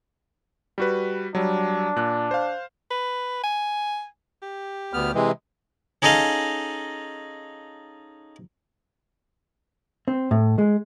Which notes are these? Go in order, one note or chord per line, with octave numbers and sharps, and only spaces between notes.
G3 F#4 B4
F#3 G3 D4
A#2 F#6
C5 F5
B4
G#5
G4
D2 B3 F6
C3 E3 G#3
C#4 D#4 G#4 A4 D#5 F5
C4
A2
G#3